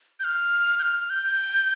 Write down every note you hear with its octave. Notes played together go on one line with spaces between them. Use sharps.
G6
F6
G6
F6
G6